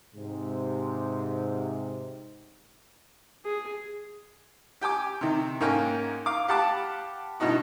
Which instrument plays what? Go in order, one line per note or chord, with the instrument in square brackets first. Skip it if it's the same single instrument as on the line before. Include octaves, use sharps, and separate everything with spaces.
[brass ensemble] G#2 C3
[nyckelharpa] G#4
[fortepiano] G4 G5 G#5 D6
C3 D#3
G#2 A#3 C#4 F5 G5 G#5
F5 D6
G4 F5 F#5 A5 B5 D6
G2 B2 E3 D#4 F#4